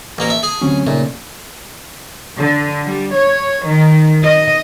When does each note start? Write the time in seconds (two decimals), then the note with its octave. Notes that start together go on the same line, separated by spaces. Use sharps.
0.18 A1 A#3 A#4 G#5 C#7
0.30 E5 A5
0.43 G#4 G#5
0.61 D2 C3 F#3 C#4
0.87 A#2 C#3 A3 D#4
2.38 D3
2.85 G3
3.14 C#5
3.66 D#3
4.23 D#5